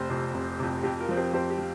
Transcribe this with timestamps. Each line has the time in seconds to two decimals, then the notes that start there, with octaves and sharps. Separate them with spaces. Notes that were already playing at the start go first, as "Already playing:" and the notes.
Already playing: F1 G4 C5
0.10 F2 C3
0.34 F1
0.59 F2 C3
0.83 F2 G4
1.00 F4 A#4
1.09 F3 C4
1.17 G4 C5
1.33 F2 G4 C5
1.50 G4
1.58 F3